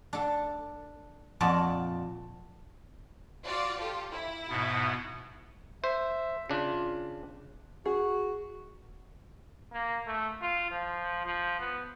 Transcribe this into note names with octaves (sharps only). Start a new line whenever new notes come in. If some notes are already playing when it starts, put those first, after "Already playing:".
D4 A4
F2 A#2 F#4 D5 A5
F4 F#4 D5
F4 G4 A4
E4
G#2 B2 B3
C5 E5
C#3 D4 F4
F#4 G#4
A#3
A3
F4
F3
F3
B3